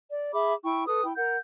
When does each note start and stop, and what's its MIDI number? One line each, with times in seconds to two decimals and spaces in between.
0.10 0.32 74
0.33 0.54 68
0.33 0.54 76
0.33 0.54 83
0.33 0.54 86
0.64 0.86 64
0.64 0.86 79
0.64 0.86 85
0.87 1.03 69
0.87 1.03 71
0.87 1.03 87
1.04 1.13 64
1.04 1.13 79
1.16 1.38 70
1.16 1.38 78
1.16 1.38 91